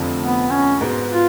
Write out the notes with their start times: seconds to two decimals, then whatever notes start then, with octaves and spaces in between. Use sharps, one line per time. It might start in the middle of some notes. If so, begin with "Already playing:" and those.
Already playing: F1 F2 D3 F3 A3
0.21 B3
0.50 C#4
0.81 G#2 G#3 B3 F#4
1.11 F4